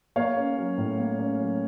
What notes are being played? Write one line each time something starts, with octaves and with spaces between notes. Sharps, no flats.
A#3 C#5 F5
C#4
F#3
A2
A#3
C#4
F#3